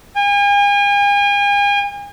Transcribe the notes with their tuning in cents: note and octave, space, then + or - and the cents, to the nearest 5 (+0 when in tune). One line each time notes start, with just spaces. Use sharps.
G#5 -40